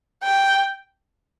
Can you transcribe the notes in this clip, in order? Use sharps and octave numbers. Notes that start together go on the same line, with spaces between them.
G5